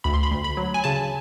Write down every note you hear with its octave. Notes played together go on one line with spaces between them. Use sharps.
D2 B5
C6
B5
D2
B5
F#3
G#5
C#3 A5